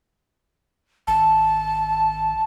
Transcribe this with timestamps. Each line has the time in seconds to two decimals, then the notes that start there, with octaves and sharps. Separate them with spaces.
1.07 G#1 A5